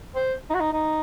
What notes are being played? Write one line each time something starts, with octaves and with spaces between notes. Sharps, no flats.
C5
D#4
F#4
D#4
D#4